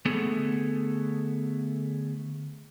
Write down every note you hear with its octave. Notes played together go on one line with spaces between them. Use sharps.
D3 A3 B3 G#4 A4